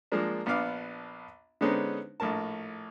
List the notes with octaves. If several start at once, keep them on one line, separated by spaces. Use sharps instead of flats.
F3 G#3 A#3 D4
A#1 B3 D4 F5 D6 F6
D3 G#3 B3 C#4 D#4 C5
A#1 A2 A#4 A5